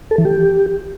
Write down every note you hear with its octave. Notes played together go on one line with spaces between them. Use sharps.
A4
E3
G4